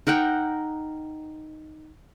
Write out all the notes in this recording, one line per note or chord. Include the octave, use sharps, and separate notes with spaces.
D#4 A#4 F#5 G5